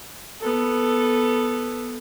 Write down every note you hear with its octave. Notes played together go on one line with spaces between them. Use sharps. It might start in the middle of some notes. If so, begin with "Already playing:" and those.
B3 A4